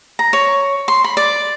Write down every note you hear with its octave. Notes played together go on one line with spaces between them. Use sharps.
A#5
C#5
C6
B5
D5